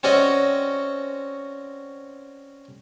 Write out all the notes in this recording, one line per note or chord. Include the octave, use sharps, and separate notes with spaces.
C4 C#4 F#4 D5 D#5